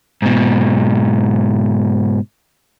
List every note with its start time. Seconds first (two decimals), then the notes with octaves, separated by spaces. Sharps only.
0.22 G#2 B2